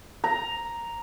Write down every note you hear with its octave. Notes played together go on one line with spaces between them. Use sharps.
A#5